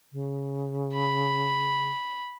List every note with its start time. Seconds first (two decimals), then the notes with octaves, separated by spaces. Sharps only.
0.12 C#3
0.93 B5